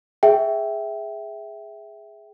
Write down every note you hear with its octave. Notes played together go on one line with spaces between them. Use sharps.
G#4 E5 G5